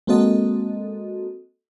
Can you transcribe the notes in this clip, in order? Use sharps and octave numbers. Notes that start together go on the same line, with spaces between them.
G#3 A#3 C4 F#4 A4 D#5